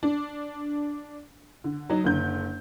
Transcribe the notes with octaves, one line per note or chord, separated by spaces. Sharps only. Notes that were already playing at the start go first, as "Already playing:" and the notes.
D4
D3
F#3 D#4
F#1 D3 G6